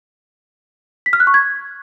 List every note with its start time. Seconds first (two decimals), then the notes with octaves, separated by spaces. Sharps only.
1.06 B6
1.13 F6
1.20 F#6
1.27 C#6
1.34 G#6